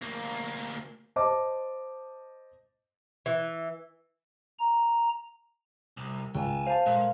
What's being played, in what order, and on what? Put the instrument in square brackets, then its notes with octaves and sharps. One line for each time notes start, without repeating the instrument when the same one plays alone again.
[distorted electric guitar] D2 A#3
[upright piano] C5 D#5 A5 D6
[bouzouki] E3
[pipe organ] A#5
[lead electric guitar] C2
[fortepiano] C#2 [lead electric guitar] G5 G#5
[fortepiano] C5 A5 [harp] F5
[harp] A#2 [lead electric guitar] G#3